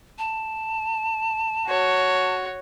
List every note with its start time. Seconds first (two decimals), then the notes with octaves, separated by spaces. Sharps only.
0.18 A5
1.67 F#4 C#5